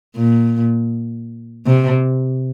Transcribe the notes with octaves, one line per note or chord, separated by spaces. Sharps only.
A#2
C3